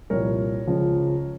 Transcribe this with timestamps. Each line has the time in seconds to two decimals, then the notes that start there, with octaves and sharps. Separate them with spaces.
0.10 C2 A#2 F3 A#4 C#5
0.67 C#2 C#3 F3